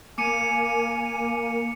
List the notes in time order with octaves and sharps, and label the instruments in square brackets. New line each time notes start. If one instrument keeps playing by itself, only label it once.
[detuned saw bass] A#3 [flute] G#5 [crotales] D6 C#7 D#7